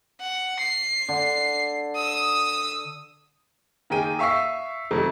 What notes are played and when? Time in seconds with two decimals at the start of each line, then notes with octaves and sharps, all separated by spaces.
0.21 F#5
0.60 C7
1.09 D3
1.96 D#6 E6
3.90 D#3 A#3 G#4 G5 D#7
4.19 E5 F5 C#6 E6 B6 C7
4.91 F2 C3 D#3 F#3 A3